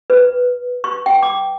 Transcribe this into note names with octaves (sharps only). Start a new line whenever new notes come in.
B4
C#6
G5
D6